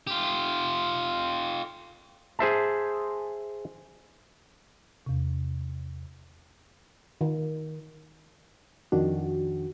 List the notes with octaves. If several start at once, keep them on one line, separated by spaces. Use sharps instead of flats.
F4 G4
G#4 C5 E5 A5
E2 C3
D#3
F2 D#3 D4 F#4